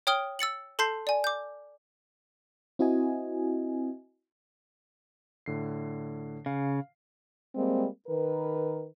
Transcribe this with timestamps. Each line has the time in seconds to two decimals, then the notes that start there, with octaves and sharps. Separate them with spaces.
0.07 C#5 G5 D#6 F6 D7 G7
0.39 E6 A6 C#7 F#7
0.79 A4 A5 C6 G6 C7
1.07 D5 G#5
1.24 D6 G6
2.79 C4 E4 F#4 D#5 G#5
5.46 A2 D3 C7
6.46 C#3 F5
7.54 G3 G#3 A#3 C4
8.07 D#3 A#4 B4